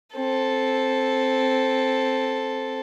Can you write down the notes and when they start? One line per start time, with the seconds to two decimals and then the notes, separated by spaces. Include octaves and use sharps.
0.16 C4 A4